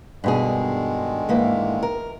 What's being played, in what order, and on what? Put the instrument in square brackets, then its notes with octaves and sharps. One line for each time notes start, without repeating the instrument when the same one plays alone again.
[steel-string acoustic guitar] G2 B2 G#4 [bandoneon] D3 D#3 G#3
[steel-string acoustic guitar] G#2 E3 A#3
A#4